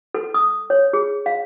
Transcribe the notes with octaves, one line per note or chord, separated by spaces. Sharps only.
A4
D#6
C#5
G#4
F5